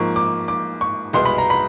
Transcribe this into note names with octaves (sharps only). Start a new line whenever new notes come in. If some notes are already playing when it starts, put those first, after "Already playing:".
Already playing: G#2 F3 A#3 C#6
D6
D6
C#6
C2 B2 G#3 B3 C6
B5
A#5
B5